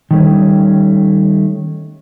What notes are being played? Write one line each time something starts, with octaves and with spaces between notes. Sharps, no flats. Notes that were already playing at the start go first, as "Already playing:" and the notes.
D#3 G3 A3 C#4